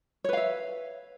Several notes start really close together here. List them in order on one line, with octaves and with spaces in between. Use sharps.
C#5 B4 F5 E5